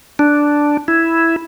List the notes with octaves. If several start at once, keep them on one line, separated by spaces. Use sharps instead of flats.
D4
E4